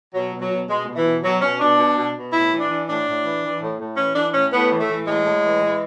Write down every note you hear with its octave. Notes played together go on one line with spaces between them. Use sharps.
B2 F#3
B2
F#3
B2
B2 G#3
B2
E3
B2
B2 F#3
B2 C#4
B2 D4
B2
B2
B2
A2 E4
E3
D4
E3
A2 D4
A2
E3
E3
A2
A2
E3 C#4
E3 D4
A2 C#4
A2 B3
E3
A3
E3
A2 G#3
A2
E3
E3